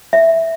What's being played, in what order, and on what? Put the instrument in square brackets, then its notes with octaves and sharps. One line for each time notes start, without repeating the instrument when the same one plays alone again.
[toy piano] E5